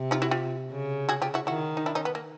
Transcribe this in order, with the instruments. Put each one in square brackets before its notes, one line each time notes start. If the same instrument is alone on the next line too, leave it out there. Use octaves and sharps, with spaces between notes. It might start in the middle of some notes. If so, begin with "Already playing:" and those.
Already playing: [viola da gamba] C3
[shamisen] D#4 F4
E4 F#4
F4 G4
[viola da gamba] C#3
[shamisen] F#4 G#4
F4 G4
E4 F#4
[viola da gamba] D#3 [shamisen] E4 F#4
[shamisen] D#4
D4 E4
C#4 D#4
B3
A#3